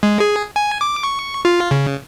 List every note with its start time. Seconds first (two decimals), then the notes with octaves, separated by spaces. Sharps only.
0.03 G#3
0.20 G#4
0.56 G#5
0.81 D6
1.03 C#6
1.45 F4
1.71 C#3